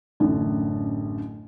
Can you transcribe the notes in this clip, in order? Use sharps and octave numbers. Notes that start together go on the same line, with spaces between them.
A1 F#2 A2 D3